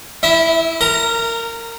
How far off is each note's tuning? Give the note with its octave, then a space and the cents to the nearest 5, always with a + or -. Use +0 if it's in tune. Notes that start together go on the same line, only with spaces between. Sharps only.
E4 +0 E5 -30
A#4 -20 A#5 +0